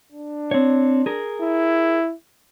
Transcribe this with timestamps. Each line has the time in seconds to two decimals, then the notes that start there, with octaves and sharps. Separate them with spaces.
0.12 D4
0.51 C4 C#5
1.06 G#4 A#4
1.41 E4